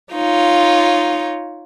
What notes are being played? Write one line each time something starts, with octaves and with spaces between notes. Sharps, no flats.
D#4 F4 C#5